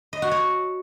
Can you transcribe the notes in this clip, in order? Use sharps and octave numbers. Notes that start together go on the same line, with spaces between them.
D#5
F#4
C#5